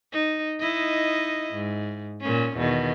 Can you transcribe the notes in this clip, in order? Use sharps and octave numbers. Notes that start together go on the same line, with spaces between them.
D#4
D#4 E4 D#5
G#2
A#2 C#4
E2 B2 D#3